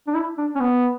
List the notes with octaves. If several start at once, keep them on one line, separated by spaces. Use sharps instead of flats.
D4
E4
D4
C#4
B3